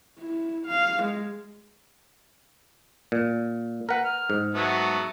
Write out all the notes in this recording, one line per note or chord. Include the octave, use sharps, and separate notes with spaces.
E4
F5
G#3
A#2
A#4 B4 F#5
F6
G#2
F#3 A3 B3